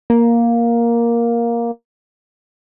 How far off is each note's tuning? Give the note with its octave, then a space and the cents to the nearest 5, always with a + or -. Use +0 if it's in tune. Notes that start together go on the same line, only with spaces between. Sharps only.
A#3 +5